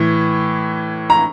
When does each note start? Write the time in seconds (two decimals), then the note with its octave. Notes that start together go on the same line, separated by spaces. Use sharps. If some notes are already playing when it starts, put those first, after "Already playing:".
Already playing: A2 E3
1.10 A#5